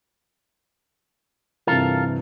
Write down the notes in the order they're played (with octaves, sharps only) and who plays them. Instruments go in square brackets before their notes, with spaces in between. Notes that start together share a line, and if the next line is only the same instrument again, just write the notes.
[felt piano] G2 C3 E3 [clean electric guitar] F4 A4 A#4